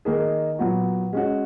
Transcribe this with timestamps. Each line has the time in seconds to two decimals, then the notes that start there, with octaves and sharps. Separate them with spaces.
0.05 D#3 A#3 D#4 G#4
0.59 A#2 F#3 B3 F#4
1.13 G#3 C#4 F#4